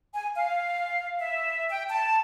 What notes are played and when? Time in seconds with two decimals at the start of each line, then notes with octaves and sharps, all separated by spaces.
0.14 G#5
0.35 F5
1.19 E5
1.69 G5
1.89 A5